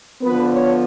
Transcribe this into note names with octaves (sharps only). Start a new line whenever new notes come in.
D3 F3 B3 B4
C#5